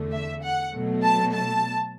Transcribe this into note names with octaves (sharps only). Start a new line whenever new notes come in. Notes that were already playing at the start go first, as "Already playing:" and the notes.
Already playing: E2 D3 A3
E5
F#5
B2 F#3 A3
A5
A5